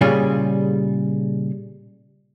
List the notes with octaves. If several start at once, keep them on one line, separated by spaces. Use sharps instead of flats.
A#2 C#3 G3 F4 G#4